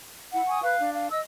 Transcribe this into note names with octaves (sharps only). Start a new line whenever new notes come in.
E4 F#5
G#5 C#6 D#6
B4 F5 F#6
D4
F5
D#5 E6